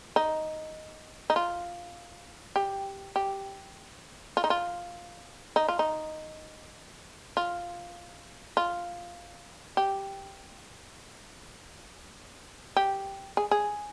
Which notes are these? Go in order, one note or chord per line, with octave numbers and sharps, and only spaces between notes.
D#4
D#4
F4
G4
G4
F4
D#4
F4
D#4
F4
D#4
F4
F4
G4
G4
G#4
G#4